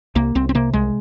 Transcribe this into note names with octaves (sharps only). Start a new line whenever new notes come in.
C2 A#3
C2 C4
C4
C3 A#3
C2 G#3